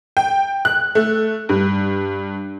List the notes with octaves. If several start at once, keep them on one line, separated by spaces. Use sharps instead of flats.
G5
F#6
A3
G2